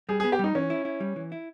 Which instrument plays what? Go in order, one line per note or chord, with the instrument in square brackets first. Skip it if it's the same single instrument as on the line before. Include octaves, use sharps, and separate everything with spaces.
[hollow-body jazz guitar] G3 [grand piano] G#4
[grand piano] G#4
[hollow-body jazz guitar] B3
[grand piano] G4
[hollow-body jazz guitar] G3 [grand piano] D#4
[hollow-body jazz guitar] E3 [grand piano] C#4
[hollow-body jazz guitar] E4
E4
G3
E3
E4